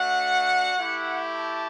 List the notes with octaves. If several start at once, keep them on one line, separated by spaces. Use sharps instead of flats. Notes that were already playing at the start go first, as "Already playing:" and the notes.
Already playing: A3 D4 F#4 F#5
A3 E4 G4
A5